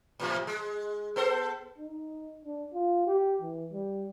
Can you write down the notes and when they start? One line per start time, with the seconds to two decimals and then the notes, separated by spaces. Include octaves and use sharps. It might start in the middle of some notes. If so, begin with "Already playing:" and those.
0.20 A2 C3 F3
0.47 G#3
1.16 B3 A4 C5
1.78 D#4
2.45 D4
2.74 F4
3.07 G4
3.42 E3
3.73 G3